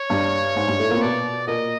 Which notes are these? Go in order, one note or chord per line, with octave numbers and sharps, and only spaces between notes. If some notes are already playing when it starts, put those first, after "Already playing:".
Already playing: C#5
G2 G3
G#2 G#3
G2 G3
A2 A3
A#2 A#3
C4
B2 B3 D5
A#2 A#3 D#5